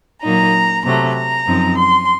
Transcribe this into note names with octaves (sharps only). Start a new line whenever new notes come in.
A#2 F#3 A#3 D#4 A#5
C3 F#3 A3 A#5
A#5
F#2 F3 C4 D#4
C6